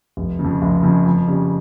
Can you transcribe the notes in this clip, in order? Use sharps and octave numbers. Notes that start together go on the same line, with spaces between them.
F1
C#3
F2
F1
F2 C#3
F2
C#3 G3